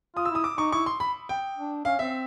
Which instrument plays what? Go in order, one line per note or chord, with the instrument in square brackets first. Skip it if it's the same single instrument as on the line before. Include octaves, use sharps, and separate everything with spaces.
[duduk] F4 [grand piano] D#6
[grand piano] E6
[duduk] E4 [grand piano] D#6
[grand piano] D6
[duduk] D#4 [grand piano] C#6
[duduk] E4 [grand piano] C#6
[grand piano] C6
B5
G5
[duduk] D4
[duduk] C#4 [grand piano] F5
[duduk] C4 [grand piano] E5